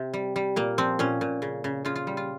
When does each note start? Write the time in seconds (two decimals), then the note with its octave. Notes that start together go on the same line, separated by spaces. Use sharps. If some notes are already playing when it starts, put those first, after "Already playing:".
Already playing: C3
0.14 G3
0.36 G3
0.56 A#2 A#3
0.78 F3 C4
0.99 A#2 C#4
1.21 A#2
1.42 C#3
1.64 C#3
1.85 C#3 F4
1.95 F4
2.07 G3
2.17 F4